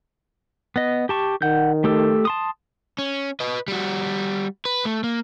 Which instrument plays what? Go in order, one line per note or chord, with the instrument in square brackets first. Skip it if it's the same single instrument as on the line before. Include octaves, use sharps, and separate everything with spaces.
[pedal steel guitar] B3 D#5
G4 A5 C#6
[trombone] D#3 [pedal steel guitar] F#5 G6
[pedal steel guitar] A3 G4 A4
A5 C6 D#6
[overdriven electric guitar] C#4
B4 D#5
G3 F#4
B4
A3
A#3